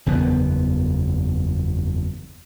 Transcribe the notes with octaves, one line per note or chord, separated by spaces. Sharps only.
F#1 E2 B3